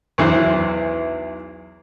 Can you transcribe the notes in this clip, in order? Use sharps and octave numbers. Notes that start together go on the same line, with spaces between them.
B1 E2 E3 C5